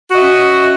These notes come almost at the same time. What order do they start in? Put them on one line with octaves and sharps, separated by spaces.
F#4 D#5 E5 C#4